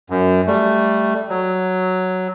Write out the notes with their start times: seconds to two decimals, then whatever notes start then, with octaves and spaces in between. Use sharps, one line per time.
0.10 F#2
0.47 G3 A3
1.30 F#3